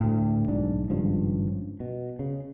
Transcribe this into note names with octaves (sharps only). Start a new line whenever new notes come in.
D2 A2
B1 G#2 D4
G#1 G2 C#3 F3
B2
C#3